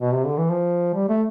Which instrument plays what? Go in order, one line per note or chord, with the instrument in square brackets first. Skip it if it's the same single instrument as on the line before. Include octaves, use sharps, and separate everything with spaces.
[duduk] B2
C3
D3
E3
F3
G3
A3